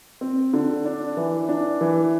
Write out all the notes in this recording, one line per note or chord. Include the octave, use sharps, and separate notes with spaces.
C4
D3
D4
E3
D4
E3